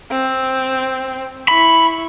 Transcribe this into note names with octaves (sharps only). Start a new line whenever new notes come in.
C4
E4 B5 C#6